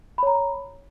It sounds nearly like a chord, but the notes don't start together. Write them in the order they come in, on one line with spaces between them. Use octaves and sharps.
B5 C#5 A#5